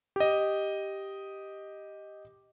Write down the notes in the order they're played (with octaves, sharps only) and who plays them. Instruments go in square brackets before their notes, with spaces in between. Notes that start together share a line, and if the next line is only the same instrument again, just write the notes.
[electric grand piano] G4 D#5